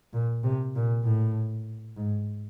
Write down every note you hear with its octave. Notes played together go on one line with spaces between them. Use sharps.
A#2
C3
A#2
A2
G#2